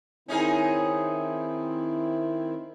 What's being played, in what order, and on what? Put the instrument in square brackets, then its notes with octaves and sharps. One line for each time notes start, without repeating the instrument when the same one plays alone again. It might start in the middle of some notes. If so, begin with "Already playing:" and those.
[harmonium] D#3 C4 E4 [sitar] C#4 D#4 G#4